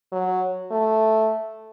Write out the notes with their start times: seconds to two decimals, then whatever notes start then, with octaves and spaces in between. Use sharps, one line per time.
0.12 F#3
0.71 A3